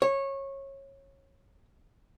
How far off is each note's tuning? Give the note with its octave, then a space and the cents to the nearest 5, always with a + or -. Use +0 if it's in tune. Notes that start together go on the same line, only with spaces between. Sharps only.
C#5 -20